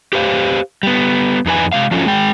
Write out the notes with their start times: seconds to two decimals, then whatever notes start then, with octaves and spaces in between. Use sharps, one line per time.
0.13 G4 B4 C5 F5
0.83 G3 B3
1.46 F2 D#4 B4 G#5
1.73 C3 F3 G#3 F5
1.91 F3 F#3 A3 C#4 F4
2.06 G#3 G5